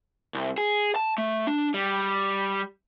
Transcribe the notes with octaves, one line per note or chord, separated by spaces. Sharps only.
C2
G#4
A5
A3
D4
G3